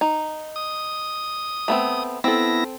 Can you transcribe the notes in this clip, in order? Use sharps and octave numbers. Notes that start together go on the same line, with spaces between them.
D#4
D#6
A3 B3 C4
B3 C4 E4 A4 A#6